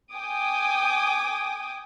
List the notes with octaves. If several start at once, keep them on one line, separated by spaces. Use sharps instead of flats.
G5 G#5 D6 D#6